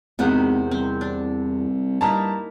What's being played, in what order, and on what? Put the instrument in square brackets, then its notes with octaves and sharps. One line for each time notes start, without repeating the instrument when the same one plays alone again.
[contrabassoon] G#1 [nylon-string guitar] E2 B3 F#5 [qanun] C3 D#3
[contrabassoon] C2 [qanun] C4
[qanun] D4
[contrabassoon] G2 [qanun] A#3 D#4 E4 [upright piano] A5 A#5